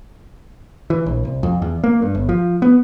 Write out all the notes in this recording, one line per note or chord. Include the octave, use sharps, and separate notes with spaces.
E3
A#1
C2
F2
E2
A#3
G2
G1
F3
B3